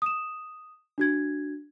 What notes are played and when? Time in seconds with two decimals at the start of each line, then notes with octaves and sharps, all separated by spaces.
0.02 D#6 E7
0.98 D4 F#4 G#6